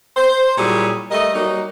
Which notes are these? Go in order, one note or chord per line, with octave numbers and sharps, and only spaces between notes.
C5
A#2 F#3 G3 E4 G#4 C#5
G3 A3 A#4 D#5
F#3 G3 A#3 D#4